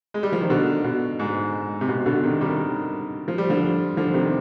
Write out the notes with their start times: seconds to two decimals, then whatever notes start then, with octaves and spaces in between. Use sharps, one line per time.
0.14 G#3
0.23 G3
0.32 F3
0.41 D#3
0.50 B2 D3
0.84 B2
1.19 G#2
1.81 C3
1.89 B2
2.06 B2 D3
2.23 C3 D#3
2.41 D#3 G3
3.28 F3
3.38 G3
3.50 D3 F3
3.97 D3 F3
4.14 C3 D#3